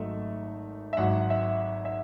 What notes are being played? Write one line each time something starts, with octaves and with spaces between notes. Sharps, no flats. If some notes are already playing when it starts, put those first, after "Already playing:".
Already playing: G#1 G#2 F#3 A3 D#4 E5
E5
G#1 G#2 F#3 F#5
E5
E5